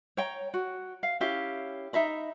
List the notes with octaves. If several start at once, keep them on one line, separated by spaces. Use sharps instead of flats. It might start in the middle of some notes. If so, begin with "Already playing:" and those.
C#5 G5 A#5
F#4
F5
C#4 E4 G4 F5
D#4 E5 A#5 B5